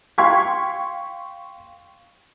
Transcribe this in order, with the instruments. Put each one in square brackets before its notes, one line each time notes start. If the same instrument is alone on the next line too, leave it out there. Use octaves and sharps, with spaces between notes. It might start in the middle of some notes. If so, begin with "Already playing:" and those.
[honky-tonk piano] F5 G5 C6 C#6 G#6 B6